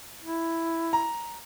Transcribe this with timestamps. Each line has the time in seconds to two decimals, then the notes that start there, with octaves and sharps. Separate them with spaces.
0.22 E4
0.93 A#5